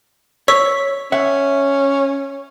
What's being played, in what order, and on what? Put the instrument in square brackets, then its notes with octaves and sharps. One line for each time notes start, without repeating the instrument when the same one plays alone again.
[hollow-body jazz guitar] C#5 [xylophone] C#6 E6 B6
[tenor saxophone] C#4 [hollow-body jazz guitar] E5 F#5